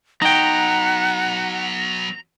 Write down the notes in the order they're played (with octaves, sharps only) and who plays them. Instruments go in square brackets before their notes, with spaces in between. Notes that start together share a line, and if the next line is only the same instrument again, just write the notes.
[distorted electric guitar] F#3 B3 [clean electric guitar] D#4 G5 [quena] F#5 [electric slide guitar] A#5